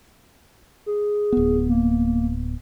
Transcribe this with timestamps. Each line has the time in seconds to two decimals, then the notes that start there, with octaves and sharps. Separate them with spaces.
0.86 G#4
1.32 D1 B3
1.69 A#3